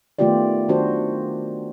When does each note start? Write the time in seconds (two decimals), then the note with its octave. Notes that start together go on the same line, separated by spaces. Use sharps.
0.19 D#3 A3 B3 F4 G4 D5
0.69 D#3 D4 F#4 C5